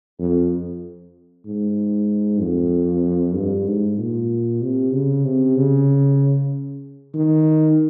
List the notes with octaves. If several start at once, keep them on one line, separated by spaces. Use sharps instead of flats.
F2
G#2
F2
G2
G#2
A#2
C3
C#3
C3
C#3
D#3